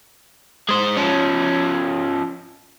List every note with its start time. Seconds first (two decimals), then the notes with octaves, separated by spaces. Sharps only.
0.69 G#3 C5
0.97 F3 C#4